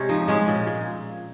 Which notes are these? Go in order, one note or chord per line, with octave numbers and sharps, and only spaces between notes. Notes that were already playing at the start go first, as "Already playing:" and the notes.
Already playing: C3 G#3 C#4
F3 D#4
G#3 C#4
A#2
A#2